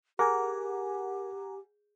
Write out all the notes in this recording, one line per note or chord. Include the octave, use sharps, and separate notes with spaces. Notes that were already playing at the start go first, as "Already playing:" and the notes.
G4 G#4 A#4 F#5 G#5 A#5